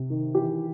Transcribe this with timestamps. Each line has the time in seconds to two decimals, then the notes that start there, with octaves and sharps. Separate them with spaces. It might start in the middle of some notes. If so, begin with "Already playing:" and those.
Already playing: C3
0.10 D#3
0.35 E3 G4